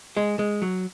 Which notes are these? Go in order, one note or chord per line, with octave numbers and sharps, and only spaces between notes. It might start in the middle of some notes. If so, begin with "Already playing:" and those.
G#3
G#3
F#3